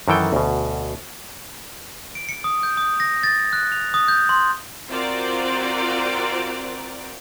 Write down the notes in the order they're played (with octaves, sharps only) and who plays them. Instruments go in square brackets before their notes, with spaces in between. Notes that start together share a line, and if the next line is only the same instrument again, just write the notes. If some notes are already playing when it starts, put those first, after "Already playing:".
[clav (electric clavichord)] F#2 D#3 E3 A4 G5
D2 B2
[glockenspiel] D7
C#7
D#6
G6
D#6
A#6
A6
F#6
F7
D#6
G6
C6
[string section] C4 F4 F#4 A#4 C5 D5